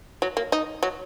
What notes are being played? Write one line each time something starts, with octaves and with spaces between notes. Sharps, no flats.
F#3
A#3
D#4
F#3